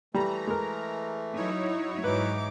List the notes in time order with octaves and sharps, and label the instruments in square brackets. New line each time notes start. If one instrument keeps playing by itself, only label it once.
[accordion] E3 A3 [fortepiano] G3 [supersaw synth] A#5
[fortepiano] G#3 A#4
[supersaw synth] F#3 E4 C#5 [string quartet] D#4
[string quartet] G#2 D6 [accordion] E3 D#4 [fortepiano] B4